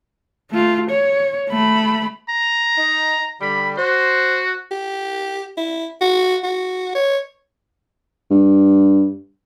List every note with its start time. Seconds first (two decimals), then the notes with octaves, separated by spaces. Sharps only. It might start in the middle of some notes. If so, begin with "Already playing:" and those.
0.51 A3 F4
0.90 C#5
1.49 A3 B5
2.29 A#5
2.77 D#4
3.41 D3 G3 B5
3.78 F#4 C5
4.71 G4
5.57 E4
6.01 F#4
6.44 F#4
6.95 C#5
8.31 G2